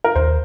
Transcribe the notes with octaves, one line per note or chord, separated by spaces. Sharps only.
A#4
D#2 C5